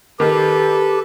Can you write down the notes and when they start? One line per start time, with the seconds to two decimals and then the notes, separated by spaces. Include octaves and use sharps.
0.20 D#3 G4 A4 B4